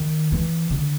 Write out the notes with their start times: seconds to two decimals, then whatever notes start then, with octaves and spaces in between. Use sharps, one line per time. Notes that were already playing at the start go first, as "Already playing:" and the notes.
Already playing: D#3
0.32 E3
0.71 D3